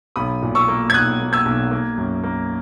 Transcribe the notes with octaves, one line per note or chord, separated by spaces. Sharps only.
B1 B5 D#6
A#2
C#6 E6
A#3
G#6
B1 D#6 F#6
A#3
E6 G#6
B1
A#3
F#2
A#3